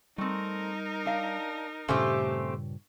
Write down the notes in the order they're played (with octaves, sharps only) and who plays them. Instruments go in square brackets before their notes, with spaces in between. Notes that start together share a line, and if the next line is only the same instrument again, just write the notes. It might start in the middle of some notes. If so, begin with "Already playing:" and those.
[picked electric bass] G3 [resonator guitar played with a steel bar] A3 C4 [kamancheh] D#4 A#4
[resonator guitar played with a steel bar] D4 F5
[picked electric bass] G2 A#2 C#3 [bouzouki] A3 C4 G4 [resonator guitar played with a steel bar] C#4